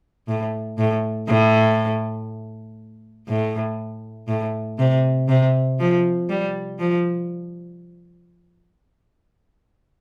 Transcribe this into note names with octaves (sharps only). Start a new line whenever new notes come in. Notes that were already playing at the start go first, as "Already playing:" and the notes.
A2
A2
A2
A2
A2
C3
C3
F3
G3
F3